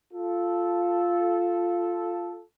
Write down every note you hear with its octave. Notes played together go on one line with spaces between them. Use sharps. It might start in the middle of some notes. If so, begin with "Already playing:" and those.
F4 A4